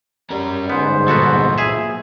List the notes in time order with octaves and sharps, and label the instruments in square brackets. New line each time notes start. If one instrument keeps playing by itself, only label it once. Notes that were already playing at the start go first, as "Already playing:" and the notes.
[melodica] G3 [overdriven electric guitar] C#4 A#4
[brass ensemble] G1 G#2 [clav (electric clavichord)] B3 [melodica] C5
[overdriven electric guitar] A#2 F#3 [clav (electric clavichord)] B3 F#4 A4
[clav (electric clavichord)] G#4 E5